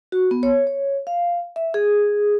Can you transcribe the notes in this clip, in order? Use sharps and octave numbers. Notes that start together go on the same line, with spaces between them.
F#4
B3
C#5
C#5
F5
E5
G#4